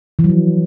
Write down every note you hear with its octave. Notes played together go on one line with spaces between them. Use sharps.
E3
F#3
F3